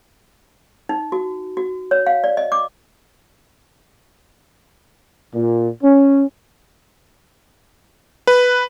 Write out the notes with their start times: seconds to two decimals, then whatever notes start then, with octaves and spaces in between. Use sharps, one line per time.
0.89 D#4
1.12 F#4
1.57 F#4
1.91 C#5
2.06 F5
2.24 D5
2.37 D#5
2.52 D6
5.33 A#2
5.83 C#4
8.27 B4